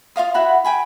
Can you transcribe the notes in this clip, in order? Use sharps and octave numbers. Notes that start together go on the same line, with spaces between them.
F4 D#5 F5 D#6
E4 F#4 F#5 B5
G5 G#5 B5